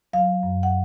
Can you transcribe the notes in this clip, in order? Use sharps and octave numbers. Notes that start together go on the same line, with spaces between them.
F#3 F5
F#2
F#5